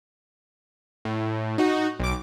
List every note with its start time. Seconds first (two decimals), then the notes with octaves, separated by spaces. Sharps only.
1.05 A2
1.58 D#4 F#4
1.99 B1 D6